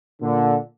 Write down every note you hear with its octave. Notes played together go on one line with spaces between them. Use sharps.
A#2 D3